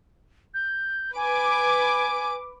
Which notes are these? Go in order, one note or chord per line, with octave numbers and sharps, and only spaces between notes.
G6
B4 G#5 D6